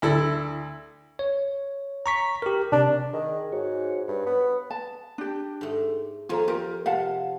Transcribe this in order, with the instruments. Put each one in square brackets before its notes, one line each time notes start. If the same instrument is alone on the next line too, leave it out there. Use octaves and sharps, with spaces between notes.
[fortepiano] D2 E4 A4
[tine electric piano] C#5
A#5 C#6 B6
G4 A#4
[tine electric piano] C3 [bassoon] D4
[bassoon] D#3 [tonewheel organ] G#4
[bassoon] G#2 [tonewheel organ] F#4 C#5
[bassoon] G2 [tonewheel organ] C#5
[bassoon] B3
[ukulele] A5
D4 G4
[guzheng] G#2 A3
[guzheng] F2 G#5 [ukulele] F4 C5 A#5
[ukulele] F4 A#4 [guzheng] G4
[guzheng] C3 [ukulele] F5 F#5 A5